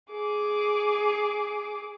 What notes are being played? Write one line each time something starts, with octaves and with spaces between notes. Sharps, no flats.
G#4 D6